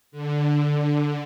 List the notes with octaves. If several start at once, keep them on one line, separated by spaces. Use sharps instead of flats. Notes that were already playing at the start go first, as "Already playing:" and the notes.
D3
D3